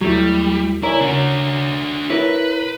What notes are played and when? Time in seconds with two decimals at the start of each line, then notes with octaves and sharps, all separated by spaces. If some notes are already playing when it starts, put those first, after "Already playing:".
0.01 D#2 F#3 G3 A3 E4
0.83 E4 A#4 C#5 D5 G#5
1.01 C#3 D4 F#4 C#5
2.10 E4 A#4 B4 C#5 E5